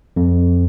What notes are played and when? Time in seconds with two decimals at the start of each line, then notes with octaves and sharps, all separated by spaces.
0.16 F2